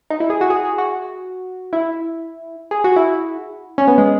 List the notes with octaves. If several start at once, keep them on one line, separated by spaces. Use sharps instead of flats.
D#4
E4
G#4
F#4
G#4
G#4
F#4
E4
G#4
F#4
E4
C#4
B3
G#3